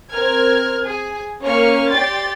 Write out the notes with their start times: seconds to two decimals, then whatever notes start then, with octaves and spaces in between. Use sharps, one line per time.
0.11 C4 A#4 F6 G#6
0.84 G#4 G#5
1.42 A#3 C#4 C#5 C#6 F6
1.91 G4 D5 G5 C6 A6